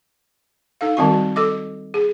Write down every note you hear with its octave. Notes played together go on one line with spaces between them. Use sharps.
D#4 A4 F5
D#3 G3 G#3 C4 F#4 C#6
A4 D#5 D6
G#4